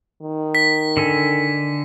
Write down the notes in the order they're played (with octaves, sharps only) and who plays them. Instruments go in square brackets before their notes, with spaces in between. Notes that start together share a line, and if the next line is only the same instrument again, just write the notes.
[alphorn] D#3
[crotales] B6
[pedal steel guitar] D3 A4 G#5